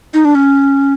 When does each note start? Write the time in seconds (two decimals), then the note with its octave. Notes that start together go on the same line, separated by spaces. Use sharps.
0.14 D#4
0.25 D4
0.35 C#4